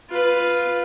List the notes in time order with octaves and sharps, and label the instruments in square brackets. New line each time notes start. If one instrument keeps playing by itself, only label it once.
[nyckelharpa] F4 B4